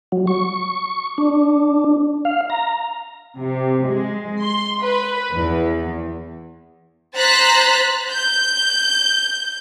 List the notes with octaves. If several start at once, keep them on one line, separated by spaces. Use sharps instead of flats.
F#3
C#6
D4
F5
A#5
C3
G#3
C6
B4
E2
C5 A#5 F#6 A6 B6
G6